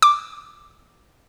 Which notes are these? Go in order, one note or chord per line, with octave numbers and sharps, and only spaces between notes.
D6